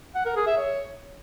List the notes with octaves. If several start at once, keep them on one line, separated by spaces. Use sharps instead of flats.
F#5
A#4
G#4
E5
C#5